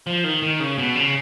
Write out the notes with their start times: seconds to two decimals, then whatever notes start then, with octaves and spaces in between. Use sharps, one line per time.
0.07 F3
0.24 D#3
0.43 D#3
0.60 C#3
0.78 B2
0.95 C#3